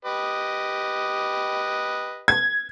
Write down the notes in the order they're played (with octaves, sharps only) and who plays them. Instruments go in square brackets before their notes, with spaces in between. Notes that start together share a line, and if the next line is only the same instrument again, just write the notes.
[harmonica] G4 B4 D#5
[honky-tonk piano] G#6